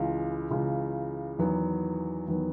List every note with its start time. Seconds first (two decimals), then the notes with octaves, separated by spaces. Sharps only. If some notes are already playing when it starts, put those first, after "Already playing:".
Already playing: C#2 C#3 E3
0.50 C#2 C#3 E3
1.39 E2 D#3 F#3 B3
2.28 E2 D#3 F#3 B3